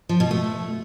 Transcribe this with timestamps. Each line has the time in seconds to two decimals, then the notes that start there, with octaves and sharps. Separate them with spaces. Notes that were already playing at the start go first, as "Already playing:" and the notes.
0.09 F3
0.20 B2
0.31 A3